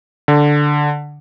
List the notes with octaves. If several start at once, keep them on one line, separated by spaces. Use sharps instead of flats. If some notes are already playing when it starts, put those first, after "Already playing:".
D3